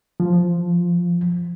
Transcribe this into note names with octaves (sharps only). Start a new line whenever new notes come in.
F3